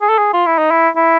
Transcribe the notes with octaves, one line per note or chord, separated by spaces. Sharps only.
G#4
A4
G#4
F4
E4
D#4
E4
E4